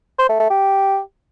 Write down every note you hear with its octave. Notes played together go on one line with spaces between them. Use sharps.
C5
A3
A3
G4